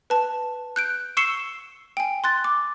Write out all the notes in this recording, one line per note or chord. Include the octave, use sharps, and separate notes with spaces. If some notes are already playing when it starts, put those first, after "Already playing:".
B4 A5
F#6 G6 D7
C#6 E6 C7 C#7 E7 G7
G5 G#5
C6 F#6 A6
D6